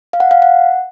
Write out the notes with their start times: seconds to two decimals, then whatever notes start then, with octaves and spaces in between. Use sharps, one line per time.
0.13 F5
0.20 F#5
0.31 F5
0.42 F#5